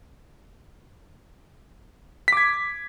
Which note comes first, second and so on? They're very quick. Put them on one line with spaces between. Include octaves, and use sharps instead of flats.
B6 D6 G#6